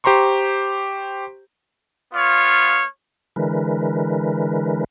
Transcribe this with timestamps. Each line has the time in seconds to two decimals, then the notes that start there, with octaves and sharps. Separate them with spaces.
0.04 G4 C5 A#5 C6 C#6
2.14 B3 F4 C#5 F5
3.36 D3 E3 G#3 A#4 B4